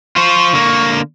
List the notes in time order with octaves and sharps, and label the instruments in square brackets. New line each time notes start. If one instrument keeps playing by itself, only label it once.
[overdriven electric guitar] F4 C5 [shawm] C#6
[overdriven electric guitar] D3 A#3